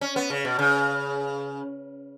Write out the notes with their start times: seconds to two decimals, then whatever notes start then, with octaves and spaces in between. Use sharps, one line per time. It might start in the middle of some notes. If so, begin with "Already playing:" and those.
0.01 C#4
0.16 B3
0.30 C#3
0.45 B2
0.59 C#3